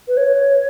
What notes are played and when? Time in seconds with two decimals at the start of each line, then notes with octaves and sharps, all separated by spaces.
0.08 B4
0.17 C#5